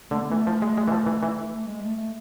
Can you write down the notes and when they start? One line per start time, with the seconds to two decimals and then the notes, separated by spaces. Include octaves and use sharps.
0.11 D3 A3
0.21 B3
0.30 E3 A3
0.47 F3
0.62 G#3
0.78 G#3
0.88 E3
0.92 F3
1.06 E3
1.23 E3
1.52 A3
1.67 G#3
1.83 A3
1.97 A3